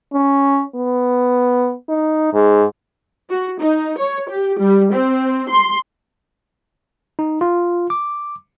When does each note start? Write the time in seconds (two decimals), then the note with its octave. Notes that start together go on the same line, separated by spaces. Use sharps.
0.13 C#4
0.75 B3
1.89 D#4
2.33 G#2
3.30 F#4
3.60 D#4
3.98 C#5
4.29 G4
4.59 G3
4.93 C4
5.50 C6
7.19 D#4
7.41 F4
7.90 D6